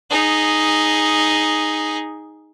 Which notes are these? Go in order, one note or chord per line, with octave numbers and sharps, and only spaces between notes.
D#4 G#4